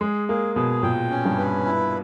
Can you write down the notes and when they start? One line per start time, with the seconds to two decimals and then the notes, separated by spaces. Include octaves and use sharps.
0.01 G#3 G#4
0.28 A#3 G#4
0.56 B2 G#4
0.83 A#2 G5
1.11 C#4
1.25 G2
1.38 B4
1.65 E4